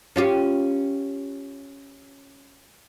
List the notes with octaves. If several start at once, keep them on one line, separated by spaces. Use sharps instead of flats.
C#4 F4 G4